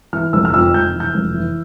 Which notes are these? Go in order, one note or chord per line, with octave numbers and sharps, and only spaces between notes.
E3 F6
F1 E6
F6
F2 E6
F1 G6
E3
G6
F1
E3